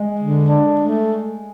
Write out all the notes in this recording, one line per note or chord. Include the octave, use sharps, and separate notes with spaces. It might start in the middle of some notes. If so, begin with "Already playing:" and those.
Already playing: G#3
D3
D4
A3